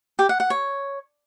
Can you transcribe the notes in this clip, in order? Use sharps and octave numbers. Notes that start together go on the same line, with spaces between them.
G4
F#5
F#5
C#5